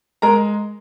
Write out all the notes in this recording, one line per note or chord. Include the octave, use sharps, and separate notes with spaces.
G#3 A#4 A#5